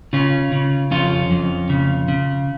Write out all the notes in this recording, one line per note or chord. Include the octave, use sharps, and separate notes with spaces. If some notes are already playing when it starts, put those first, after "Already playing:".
C#3 C#4 F4
C#3
F2 C#4 F4
F2
C#3
C#3